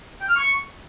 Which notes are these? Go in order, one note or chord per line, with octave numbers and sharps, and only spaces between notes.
G5
F6
C#6